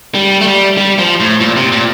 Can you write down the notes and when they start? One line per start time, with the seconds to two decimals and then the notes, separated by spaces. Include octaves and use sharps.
0.15 G3
0.41 A3
0.46 G3
0.78 G3
0.99 F3
1.20 A2
1.41 A#2
1.57 C3
1.72 A#2